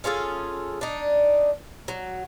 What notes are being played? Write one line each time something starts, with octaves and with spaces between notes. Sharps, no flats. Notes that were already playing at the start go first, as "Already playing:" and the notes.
C#4 F4 G#4 A4
D4 D#4
F#3